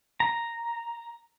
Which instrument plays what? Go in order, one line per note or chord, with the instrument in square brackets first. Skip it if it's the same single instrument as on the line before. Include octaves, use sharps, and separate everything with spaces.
[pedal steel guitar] A#5